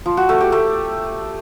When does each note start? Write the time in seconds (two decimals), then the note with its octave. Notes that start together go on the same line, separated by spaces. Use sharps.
0.06 F3
0.17 F#4
0.29 A3
0.41 G4
0.52 A3